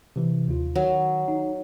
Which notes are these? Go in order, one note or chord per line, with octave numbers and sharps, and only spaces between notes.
C3 E3
D#2 F4
D#3 F#3
D#4